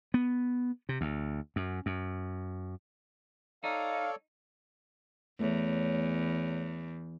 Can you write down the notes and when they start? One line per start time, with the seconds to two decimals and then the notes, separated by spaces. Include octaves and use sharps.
0.14 B3
0.89 C3
1.01 D2
1.56 F#2
1.86 F#2
3.64 D#4 A4 C#5 D5 F5
5.40 E2 A3 C#5